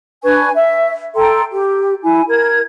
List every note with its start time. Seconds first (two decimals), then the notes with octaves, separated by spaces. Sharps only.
0.24 D4 B4 G#5 C#6
0.56 E5
1.15 A4 G5 A#5 C6
1.52 G4
2.03 E4 G#5
2.28 A#4 G#6